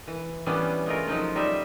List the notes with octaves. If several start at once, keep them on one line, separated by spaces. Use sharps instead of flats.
E3
E3 G3 B3 C#4 D4
G#3 A3 F4 A#4
F3 F#3 D#4 F4
G3 D#4 E5